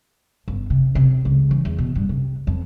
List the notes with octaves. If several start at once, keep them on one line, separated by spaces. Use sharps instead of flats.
G1
C3
C3
C#2
E3
E2
B2
G2
C3
F2